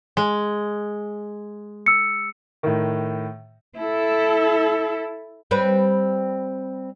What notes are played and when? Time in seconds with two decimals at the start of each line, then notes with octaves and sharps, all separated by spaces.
0.17 G#3
1.86 E6 C#7
2.63 A2 D#3
3.78 E4 A4
5.51 G3 C4 B4